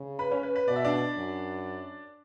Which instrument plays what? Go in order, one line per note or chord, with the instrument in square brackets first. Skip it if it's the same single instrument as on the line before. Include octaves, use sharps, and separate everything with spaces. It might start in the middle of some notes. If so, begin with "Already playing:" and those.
Already playing: [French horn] C#3
[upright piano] B4 B5
C#4 C#5
B4
B4
[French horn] B2 [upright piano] D5
[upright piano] E5
D4 D5
[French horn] F#2